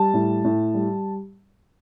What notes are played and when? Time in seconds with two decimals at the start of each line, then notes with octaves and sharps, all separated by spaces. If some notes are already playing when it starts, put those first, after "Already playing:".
Already playing: G3 A5
0.14 A2
0.44 A2
0.74 G3